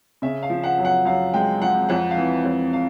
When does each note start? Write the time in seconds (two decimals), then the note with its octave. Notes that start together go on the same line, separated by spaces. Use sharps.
0.22 C#3 E5
0.43 F5
0.50 F3
0.63 F#5
0.78 F#2
0.85 F#5
1.05 F#2 F5
1.34 G#3 G5
1.62 F3 F#5
1.89 F2 F#5
2.11 F5
2.17 E3
2.45 F2
2.73 F5